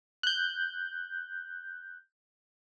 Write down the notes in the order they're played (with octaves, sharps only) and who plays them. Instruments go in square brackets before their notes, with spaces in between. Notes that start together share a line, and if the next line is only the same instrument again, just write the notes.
[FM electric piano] F#6 G6